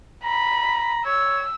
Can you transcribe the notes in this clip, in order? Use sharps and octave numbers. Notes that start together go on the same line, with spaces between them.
A#5 B5
C#5 E6